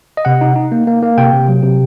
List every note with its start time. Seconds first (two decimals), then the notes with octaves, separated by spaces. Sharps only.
0.17 D#5
0.25 C3 F#5
0.41 D#4
0.56 D#4
0.72 A#3
0.87 A#3
1.03 A#3
1.18 C3 G5
1.33 C3
1.49 F#3
1.63 C3